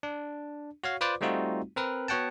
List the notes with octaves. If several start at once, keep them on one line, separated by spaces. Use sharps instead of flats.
D4
F#4 C#5 F5
F4 B4 C5 D5 D6
G3 A3 C4 D#4 F4 F#4
C4 A#4 B4
B3 F#4 C#5 F#5 G5 A5